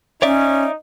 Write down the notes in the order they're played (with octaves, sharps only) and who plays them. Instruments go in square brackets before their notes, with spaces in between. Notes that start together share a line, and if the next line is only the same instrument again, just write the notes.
[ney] C#4 [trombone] D#4 [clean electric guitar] C#5 D5 E5